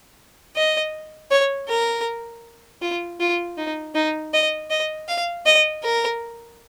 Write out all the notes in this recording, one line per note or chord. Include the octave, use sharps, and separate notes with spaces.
D#5
C#5
A#4
F4
F4
D#4
D#4
D#5
D#5
F5
D#5
A#4